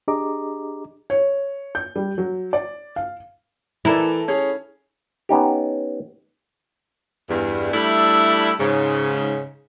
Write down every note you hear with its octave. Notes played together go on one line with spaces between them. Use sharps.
D4 G4 G#4 D#5 A#5 D6
C#5
G6
G3
F#3
D5
F5
E3 E4 A4 A#4 D5
C#4 G#4 C#5
B3 C#4 D#4 G4
E2 G2
G3 A3 D4 E4
G#2 C#3